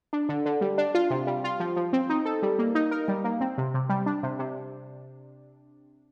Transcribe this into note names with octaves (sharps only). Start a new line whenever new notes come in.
D4
D3
D3
G3
D4
F4
C3
G3
F4
F3
F3
C4
D#4
A4
G3
A#3
D#4
A#4
G3
A#3
C4
C3
C3
G3
D4
C3
C3